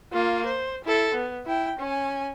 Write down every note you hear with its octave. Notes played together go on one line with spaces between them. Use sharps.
A#3 F4
C5
E4 A4
B3
E4 G5
C#4 G#5